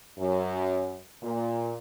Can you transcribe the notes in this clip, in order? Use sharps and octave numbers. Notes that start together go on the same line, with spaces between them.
F#2
A#2